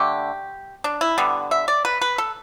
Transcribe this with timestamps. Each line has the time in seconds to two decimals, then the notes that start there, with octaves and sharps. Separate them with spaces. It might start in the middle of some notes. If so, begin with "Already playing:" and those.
Already playing: D3 A3 G4
0.84 D4
1.01 E4
1.18 D3 G3 B3
1.51 E5
1.68 D5
1.85 B4
2.02 B4
2.18 A4